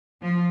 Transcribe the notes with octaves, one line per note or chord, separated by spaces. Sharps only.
F3